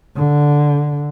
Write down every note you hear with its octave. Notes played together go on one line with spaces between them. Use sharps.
D3